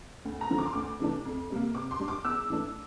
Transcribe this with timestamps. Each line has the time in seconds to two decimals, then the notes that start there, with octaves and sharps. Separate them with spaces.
0.25 D2
0.41 A#5
0.50 D3 F3
0.58 D6
0.66 C6
0.73 D2 D6
0.99 C3 E3 A3 D4
1.25 F2
1.50 C3 G3 A#3
1.75 C3 D6
1.91 C6
2.00 G3 D4
2.08 D6
2.24 E2 E6
2.50 E3 A3 D4